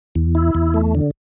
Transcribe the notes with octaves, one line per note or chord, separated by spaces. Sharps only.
E2
E4
E2
A3
D3